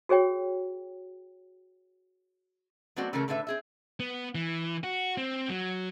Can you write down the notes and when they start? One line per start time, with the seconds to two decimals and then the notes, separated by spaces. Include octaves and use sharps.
0.09 F#4 G#4 C#5 G5
2.96 F#3 A3 B3 C4 F#4 D5
3.13 C#3 E3 A3 E4 A4 A#4
3.28 A2 D3 A4 B4 E5
3.47 C4 G#4 E5
4.00 B3
4.35 E3
4.84 F#4
5.17 C4
5.50 F#3